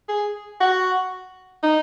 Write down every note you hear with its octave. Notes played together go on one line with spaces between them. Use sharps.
G#4
F#4
D#4